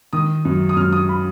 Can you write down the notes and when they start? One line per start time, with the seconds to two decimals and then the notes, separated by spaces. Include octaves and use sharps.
0.13 D#3 D#6
0.45 F#2
0.69 D#6
0.76 F#2 F6
0.93 D#6
1.09 B5